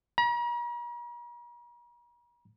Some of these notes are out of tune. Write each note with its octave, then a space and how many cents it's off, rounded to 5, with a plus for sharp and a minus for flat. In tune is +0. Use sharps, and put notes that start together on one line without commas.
A#5 +45